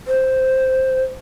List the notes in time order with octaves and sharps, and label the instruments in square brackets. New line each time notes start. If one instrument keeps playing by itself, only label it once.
[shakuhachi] C5